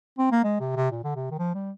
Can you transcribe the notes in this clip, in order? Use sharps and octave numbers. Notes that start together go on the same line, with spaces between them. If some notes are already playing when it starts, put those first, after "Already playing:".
C4
A#3
G#3
C3
C3
A#2
D3
C3
D#3
F3
G3